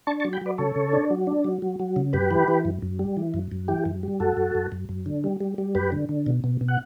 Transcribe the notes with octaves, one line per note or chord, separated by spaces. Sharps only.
D4 A5 C#6
A5 C#6
F#3
G5 B5
F#3 B4 D5
C#3 A4 C#5
C#3
D4
F#3
D4
F#3
F#3
F#3
C#3
F#2 G4 B4
E3
E3
F#2
F#2
G3
E3
F#2
F#2
E3 G4
F#2
G3
F#2 F#4 A4
F#2
F#2
F#2
F#2
D3
G3
G3
G3
F#2 G4 B4
D3
D3
B2
B2
B2
F#5